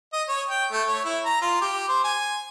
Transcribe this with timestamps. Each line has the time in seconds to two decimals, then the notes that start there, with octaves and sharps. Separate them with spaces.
0.13 D#5
0.29 C#5
0.49 G5
0.71 A3
0.88 C#5
1.05 E4
1.25 A#5
1.42 F4
1.61 G4
1.88 C5
2.04 G#5